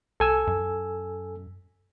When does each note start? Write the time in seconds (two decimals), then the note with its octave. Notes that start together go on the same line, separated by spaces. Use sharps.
0.20 C2 A4 G#5 E6
0.47 F#2